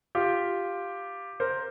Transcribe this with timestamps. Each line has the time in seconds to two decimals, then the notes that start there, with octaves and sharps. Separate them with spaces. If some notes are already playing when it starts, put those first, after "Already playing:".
0.15 F4 G4
1.40 A#4 C5